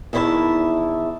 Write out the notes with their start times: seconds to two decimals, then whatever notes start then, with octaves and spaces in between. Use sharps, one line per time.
0.13 E2 D#3 E4 C5 E5 A5